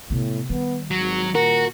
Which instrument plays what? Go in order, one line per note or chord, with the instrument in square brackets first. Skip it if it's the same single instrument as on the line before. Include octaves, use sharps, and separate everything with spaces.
[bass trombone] A2 [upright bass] C3 B3
[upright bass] D#3 G3 [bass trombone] B3
[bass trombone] G#1 [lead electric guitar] F#3
[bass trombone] A#2 [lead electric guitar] F#4 [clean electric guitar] A#4